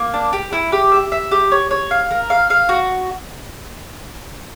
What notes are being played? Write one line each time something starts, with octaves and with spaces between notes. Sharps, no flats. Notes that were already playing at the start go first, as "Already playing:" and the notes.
Already playing: A#3
D4
G4
E4
G4
E5
E5
G4
C#5
C#5
F5
A#4
F5
F5
F#4